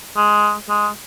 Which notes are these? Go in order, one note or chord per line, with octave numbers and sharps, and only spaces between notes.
G#3
G#3